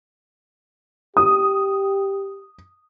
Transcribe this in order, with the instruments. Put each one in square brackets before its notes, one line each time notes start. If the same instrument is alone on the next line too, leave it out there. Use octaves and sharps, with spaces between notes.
[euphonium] G4 [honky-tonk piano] D#6